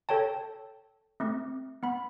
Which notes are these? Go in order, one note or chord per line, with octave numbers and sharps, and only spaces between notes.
A4 C#5 G5 A5
A3 C4
B3 B5